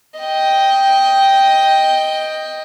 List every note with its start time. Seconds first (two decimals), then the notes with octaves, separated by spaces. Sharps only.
0.20 D#5 G5